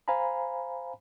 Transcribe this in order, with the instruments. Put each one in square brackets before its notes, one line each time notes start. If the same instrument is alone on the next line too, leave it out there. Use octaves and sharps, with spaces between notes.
[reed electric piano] C5 F5 G#5 A#5 B5